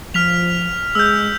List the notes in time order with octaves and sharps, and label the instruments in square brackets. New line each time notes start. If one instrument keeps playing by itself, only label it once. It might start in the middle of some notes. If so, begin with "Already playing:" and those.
[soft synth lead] F3 [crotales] F6 B6 F7
[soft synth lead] G#3 [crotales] E6 G6